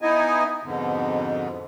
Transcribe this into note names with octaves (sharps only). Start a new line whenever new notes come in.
B3 D#4 E4 D#5 G#5
F2 G#2 B2 D3